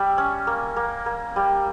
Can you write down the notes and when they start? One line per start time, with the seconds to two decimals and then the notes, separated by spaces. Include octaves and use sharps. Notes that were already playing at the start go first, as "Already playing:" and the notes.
Already playing: G3 E5
0.18 C#4
0.47 A#3
0.76 A#3
1.06 A#3
1.36 G3